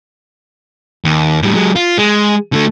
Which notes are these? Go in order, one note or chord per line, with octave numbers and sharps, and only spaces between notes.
D#2
A2 G3
F#3 G#3
F4
G#3
D3 A3